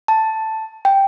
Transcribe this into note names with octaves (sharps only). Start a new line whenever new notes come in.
A5
G5